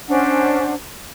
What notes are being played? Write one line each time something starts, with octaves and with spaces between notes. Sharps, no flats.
C#4 D4 C5 F#5